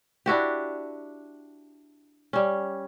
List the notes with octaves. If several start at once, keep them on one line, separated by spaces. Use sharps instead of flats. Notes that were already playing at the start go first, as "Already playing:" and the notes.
D4 E4 F#4 G4
G3 C#4